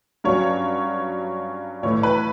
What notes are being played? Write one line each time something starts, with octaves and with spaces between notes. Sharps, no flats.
G2 F#3 C#4 C#5
A2 E3 A3 C#5
B4